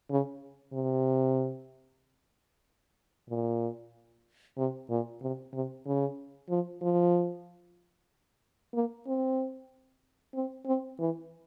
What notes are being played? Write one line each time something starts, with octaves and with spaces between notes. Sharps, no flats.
C#3
C3
A#2
C3
A#2
C3
C3
C#3
F3
F3
A#3
C4
C4
C4
E3